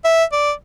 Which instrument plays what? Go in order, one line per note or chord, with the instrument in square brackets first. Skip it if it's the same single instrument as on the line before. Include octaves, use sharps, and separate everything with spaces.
[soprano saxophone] E5
D5